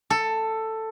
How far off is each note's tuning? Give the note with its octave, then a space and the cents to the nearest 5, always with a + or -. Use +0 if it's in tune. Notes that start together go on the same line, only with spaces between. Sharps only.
A4 +10